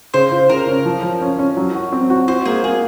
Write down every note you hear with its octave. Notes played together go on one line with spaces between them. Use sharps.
C#3 C5
F4
C#3 A#4
C#4
F3
F3
C#4
C#4
F#3
F#4
C4
F#4
F#4 C5
A#3 G#4
A#3 G#4